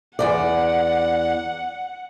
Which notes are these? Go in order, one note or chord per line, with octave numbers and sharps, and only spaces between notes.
E2 G#2 D5 F#5